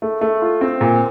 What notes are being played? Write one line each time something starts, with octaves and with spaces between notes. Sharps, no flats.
A3
A3
F4
C4
A#2